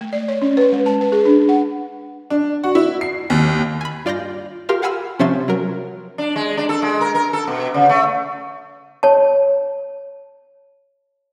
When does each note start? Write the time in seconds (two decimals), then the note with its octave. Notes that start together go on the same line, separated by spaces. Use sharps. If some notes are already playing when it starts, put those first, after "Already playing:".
0.01 A3
0.13 D5
0.28 C#5
0.42 C#4
0.57 B4
0.72 G#3
0.86 A5
1.01 B4
1.12 G#4
1.25 D4
1.49 F#5
2.30 D4
2.64 F#4
2.75 E4
3.01 C7
3.30 D#2
3.81 G#5 B5
4.05 G2 F4 D5 F6 G6 A#6
4.69 F4 G4 A#4 F5 C6
4.82 F5 F#5 G#5 B5 E6 F6
5.19 C3 F3 C#4 E5 C6 A6
5.48 F#3 A#4
6.18 D4
6.36 G#3
6.57 D4
6.69 A4
6.82 G#3
7.01 A#4
7.15 A#4
7.33 A4
7.47 B2
7.74 C#3
7.89 A3
9.03 C#5 A5